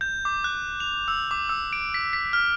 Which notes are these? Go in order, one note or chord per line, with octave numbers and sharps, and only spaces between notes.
G6
D6
F#6
F7
E6
D6
E6
D7
B6
B6
F6